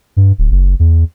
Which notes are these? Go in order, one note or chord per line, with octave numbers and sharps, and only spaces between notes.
G2
D1
F#1
E2